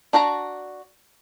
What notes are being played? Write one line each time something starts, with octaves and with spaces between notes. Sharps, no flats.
D4 F#4 A5 A#5